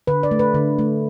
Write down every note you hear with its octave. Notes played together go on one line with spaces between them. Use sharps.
D3 B4
D5
A3
B4
D3
A3